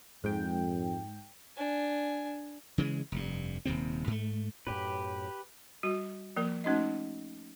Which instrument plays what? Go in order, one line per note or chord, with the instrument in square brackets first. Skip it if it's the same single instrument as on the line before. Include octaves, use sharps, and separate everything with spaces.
[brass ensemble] F2 [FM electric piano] G#2 G5
[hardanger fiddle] D4 G#5
[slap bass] C#3 E3 F#3 G#3
F1 G2
D#1 D#2 C3 C4
G#2 A3
[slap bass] F#2 A2 [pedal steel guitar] G4 B4
[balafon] G3 F#4
F3 A#3 A#4
A3 C#4 D#4 F#4 D#5